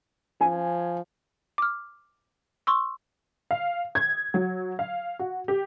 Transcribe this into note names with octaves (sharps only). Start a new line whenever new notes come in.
F3 G#5
D6 F6
C6 C#6 E6
F5
G#6
F#3
F5
F#4
G4